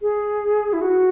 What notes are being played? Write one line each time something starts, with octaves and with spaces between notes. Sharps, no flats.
G#4
E4
F#4